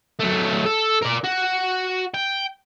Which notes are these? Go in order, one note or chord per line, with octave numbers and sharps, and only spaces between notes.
F#3 A3
A4
A#4 D5
F#4
G5